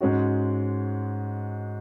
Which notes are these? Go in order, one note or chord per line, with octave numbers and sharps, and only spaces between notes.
G#2 G#3 C#4 F#4